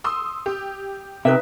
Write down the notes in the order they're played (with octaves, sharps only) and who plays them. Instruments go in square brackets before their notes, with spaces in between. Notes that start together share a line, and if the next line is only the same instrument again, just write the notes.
[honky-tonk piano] C6 D#6 E6
G4
[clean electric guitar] C3 [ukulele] D#4 B4 E5